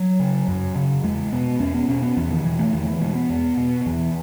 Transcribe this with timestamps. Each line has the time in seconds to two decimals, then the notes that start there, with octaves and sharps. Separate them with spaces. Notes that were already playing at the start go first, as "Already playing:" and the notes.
Already playing: F#3
0.20 C#3
0.48 F#2
0.76 C#3
1.04 E2 G#3
1.32 B2 B3
1.60 E2 C#4
1.74 B3
1.88 B2 C#4
2.03 B3
2.17 E2 E3
2.31 D#3
2.44 B2 E3
2.59 A3
2.73 E2 D#3
2.87 E3
3.01 B2 G#3
3.15 B3
3.30 E2
3.57 B2
3.86 E2 E3